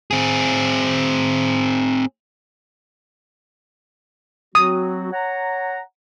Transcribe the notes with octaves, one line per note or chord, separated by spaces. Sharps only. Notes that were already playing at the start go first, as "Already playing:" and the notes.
C4 G#4
F#3 C4 F#4 D#6
C#5 F#5 A#5